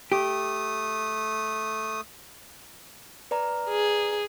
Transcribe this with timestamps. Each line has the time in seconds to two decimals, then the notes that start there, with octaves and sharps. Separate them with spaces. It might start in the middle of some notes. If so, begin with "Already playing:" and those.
0.12 A3 G4 D#6
3.31 B4 D5 A#5
3.70 G#4